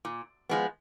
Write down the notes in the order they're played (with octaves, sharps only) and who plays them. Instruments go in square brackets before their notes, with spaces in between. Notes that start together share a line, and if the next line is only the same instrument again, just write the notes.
[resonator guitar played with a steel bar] A#2
F3 G#3 B3